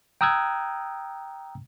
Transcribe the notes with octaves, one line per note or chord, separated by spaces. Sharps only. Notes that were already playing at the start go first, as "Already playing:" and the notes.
G5 A#5 D#6 E6 F#6 G#6